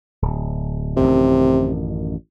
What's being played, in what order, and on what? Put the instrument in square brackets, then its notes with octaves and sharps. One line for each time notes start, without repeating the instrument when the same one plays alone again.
[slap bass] D1
[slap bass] A1 F#2 D#3 [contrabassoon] C3